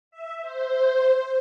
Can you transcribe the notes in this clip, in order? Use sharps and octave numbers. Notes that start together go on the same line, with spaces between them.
E5
C5